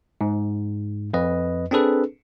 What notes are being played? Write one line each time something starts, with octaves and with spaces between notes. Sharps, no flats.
G#2
F2 B4 D#5
C4 D4 G#4 A4 B4